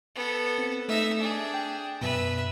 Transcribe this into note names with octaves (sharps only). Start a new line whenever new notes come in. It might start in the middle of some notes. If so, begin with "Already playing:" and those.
B3 A4
C4
A3 D#4 E5
D4 G#4
G5
F#2 B2 B4 E5